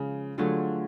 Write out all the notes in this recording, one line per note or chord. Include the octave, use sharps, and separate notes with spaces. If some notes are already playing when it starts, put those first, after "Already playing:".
Already playing: C#3 F3 G#3
D3 F#3 A3 F4 G#4